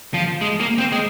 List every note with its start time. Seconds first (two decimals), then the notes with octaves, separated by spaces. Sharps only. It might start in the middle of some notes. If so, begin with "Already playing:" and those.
0.14 F3
0.41 G#3
0.60 A#3
0.78 C4
0.92 G#3